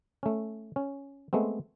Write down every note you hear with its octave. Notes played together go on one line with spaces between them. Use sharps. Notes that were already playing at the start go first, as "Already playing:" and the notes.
A3 C#4
C#4
G#3 A3 B3 C4